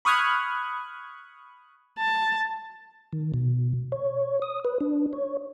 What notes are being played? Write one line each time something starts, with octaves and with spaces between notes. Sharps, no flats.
B5 C#6 D#6 F6 F#6 G#6
A5
D#3
B2
C#5
D#6
B4
D4
C#5